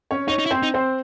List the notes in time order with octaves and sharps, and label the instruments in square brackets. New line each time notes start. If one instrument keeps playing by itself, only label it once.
[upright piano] C#4 C#5
[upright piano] C#4 C#5 [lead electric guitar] D#4
[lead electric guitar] D#4
E4
[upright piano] C4 C5
[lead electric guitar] D#4
[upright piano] C4 C5